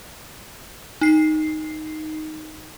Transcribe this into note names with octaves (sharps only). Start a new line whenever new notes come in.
D#4 C7